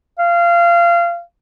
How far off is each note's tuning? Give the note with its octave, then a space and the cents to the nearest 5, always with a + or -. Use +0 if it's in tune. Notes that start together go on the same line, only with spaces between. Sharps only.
F5 -25